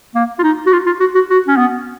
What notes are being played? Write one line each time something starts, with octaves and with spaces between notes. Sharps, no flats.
A#3
F4
D#4
F#4
F4
F4
F#4
F#4
F#4
C#4
B3